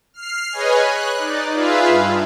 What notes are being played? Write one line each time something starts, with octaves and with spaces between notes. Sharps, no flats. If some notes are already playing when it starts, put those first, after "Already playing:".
F6 C7
G#4 B4 C#5 D#5 G#5
F#6
D#4 D5
F4 G#4 B4 E5 F5
G2